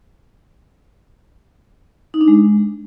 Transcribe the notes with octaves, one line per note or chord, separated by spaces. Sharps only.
D#4
D4
G#3